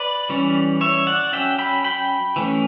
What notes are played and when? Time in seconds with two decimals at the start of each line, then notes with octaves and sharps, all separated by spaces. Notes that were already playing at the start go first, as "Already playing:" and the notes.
Already playing: B4 D5
0.29 E3 G3 C#4
0.81 C#5 E5
1.07 D5 F#5
1.33 F#3 C#4 E5 G5
1.59 G5 B5
1.84 G5 B5
2.36 E3 A3 C#4